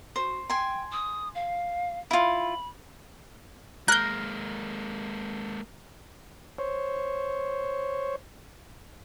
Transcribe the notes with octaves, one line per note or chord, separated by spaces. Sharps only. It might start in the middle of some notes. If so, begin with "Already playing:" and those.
F#4 C5
G5 G#5 C6
D#6
F5
E4 F4 B5
G#3 A#3 A#4 F#6 G6
C5 C#5